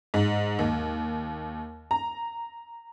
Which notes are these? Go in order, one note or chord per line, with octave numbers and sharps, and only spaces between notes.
G#2
D#2
A#5